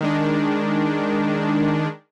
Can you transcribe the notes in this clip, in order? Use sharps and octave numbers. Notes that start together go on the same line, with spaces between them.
D#3 G#3 D4